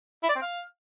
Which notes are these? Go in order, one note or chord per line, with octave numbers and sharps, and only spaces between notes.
E4
D5
C4
F5